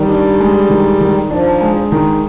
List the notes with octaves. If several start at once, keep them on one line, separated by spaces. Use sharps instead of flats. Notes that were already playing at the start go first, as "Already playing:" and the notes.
Already playing: D#3 G3
D4
G#3
D#3
D#3
F3 D4
G#3
D#3